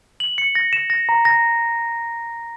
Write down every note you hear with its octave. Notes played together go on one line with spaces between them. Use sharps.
F#7
C#7
A#6
E7
A#6
A#5
A#6